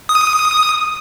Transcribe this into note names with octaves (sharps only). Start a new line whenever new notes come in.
D#6